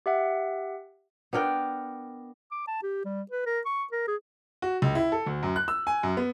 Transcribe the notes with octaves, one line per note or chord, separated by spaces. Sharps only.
G4 E5 F#5
B3 D4 A#4 G5
D6
A5
G4
G3
B4
A#4
C#6
A#4
G#4
F#4
C#2
E4
A4
D2
F#2
F#6
E6
G#5
F#2
B3